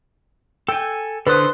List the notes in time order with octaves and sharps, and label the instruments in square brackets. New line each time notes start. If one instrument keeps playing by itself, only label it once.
[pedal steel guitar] A4 G#5 [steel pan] G5
[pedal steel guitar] D3 D#6 [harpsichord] A4 C5 [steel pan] B4